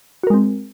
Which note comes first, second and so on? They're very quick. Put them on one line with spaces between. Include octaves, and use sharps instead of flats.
F#4 A#4 G#3 C4